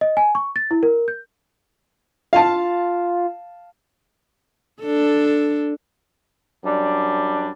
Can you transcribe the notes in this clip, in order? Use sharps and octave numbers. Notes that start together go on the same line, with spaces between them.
D#5
G#5
C#6
A6
E4
A#4
G6
F4 F5 A5
D4 A4
F#2 G3 D4